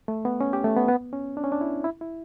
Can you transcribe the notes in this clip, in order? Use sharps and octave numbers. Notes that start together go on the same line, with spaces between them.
A3
B3
C#4
G4
A3
B3
B3
C#4
D4
C#4
D4
E4
E4
E4